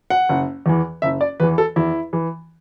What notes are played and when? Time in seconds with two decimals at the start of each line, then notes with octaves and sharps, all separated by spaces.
0.10 F#5
0.29 F#1
0.66 E2 E3
1.02 F#1 E5
1.21 D5
1.40 E2 E3 B4
1.58 A4
1.76 E2 E4
2.13 E3